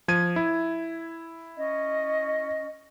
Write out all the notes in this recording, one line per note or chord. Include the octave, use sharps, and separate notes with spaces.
F3 G#6 D#7
E4
C#4 D#5